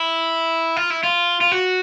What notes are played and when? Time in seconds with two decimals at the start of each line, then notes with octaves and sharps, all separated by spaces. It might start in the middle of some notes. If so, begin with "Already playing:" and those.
Already playing: E4
0.77 F4
0.90 E4
1.03 F4
1.41 F4
1.52 F#4